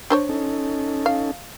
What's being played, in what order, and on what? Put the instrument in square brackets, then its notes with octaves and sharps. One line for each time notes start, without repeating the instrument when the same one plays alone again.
[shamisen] D4 C5 C#5
[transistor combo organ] C#4 D#4 A4
[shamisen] F5